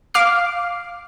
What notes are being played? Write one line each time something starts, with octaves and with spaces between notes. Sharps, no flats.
F5 D6 F6 C7